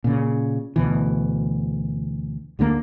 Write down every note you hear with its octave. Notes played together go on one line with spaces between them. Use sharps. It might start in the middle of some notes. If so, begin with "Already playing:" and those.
A#2 C#3
D2 B2 E3
D2 D3 E3 A#3